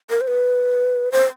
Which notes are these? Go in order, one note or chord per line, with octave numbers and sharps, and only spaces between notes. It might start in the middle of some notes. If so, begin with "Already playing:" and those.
A#4
C5
B4
C5